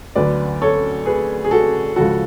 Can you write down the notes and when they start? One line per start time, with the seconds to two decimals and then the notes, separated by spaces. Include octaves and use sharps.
0.15 D2 D3 F#3 B4 D5
0.62 A4 C#5
1.06 G#4 B4
1.44 G#4
1.51 F#4 A4
1.96 C#2 C#3 F3 F#4 A4